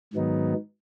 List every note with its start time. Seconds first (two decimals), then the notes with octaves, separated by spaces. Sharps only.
0.13 G#2 D#3 F#3 B3 D#4